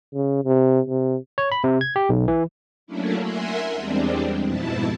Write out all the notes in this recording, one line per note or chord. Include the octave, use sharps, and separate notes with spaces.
C#3
C3
C3
C#5
B5
C3
G#6
G4
B1
E3
F#3 A3 A#3 C#4 D4 E4
A#4 E5 F#5 G#5 C6
E2 G3 G#3 C4 D4
F2 G#2 B2 E4 A5